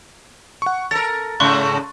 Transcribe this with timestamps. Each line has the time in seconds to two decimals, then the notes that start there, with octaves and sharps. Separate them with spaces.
0.62 F#5 C#6
0.91 A4 A#4 A6
1.40 G#2 C#3 A3 C6 C#6 F#6